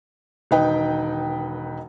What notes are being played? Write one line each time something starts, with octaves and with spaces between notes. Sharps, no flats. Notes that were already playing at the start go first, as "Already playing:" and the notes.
E1 D#3 D#4 B4 G5